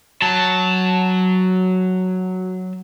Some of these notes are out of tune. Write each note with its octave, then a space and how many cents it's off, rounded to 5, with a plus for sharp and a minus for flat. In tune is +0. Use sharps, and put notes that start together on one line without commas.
F#3 +0 A5 +0